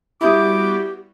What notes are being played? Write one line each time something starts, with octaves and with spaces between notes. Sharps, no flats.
G3 B3 E4 F#4 G4 D6 D#6